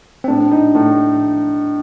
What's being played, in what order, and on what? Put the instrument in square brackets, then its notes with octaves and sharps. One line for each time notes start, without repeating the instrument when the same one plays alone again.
[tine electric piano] C4
[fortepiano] A2 [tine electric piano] D4
[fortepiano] D#4
A2